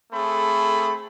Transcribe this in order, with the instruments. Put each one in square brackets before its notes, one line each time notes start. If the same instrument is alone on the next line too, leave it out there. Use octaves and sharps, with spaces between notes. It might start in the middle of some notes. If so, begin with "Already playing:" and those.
[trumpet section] A3 C4 G#4 A4 B5